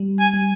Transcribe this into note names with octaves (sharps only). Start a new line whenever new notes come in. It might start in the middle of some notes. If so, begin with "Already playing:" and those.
Already playing: G3
G#5
G3